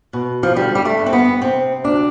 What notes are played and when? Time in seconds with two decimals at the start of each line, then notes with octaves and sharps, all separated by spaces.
0.13 B2
0.43 F3
0.56 D3 G3
0.75 G3
0.85 A3
0.99 G2
1.06 C4
1.13 B3
1.42 C3 C4
1.84 D2 D4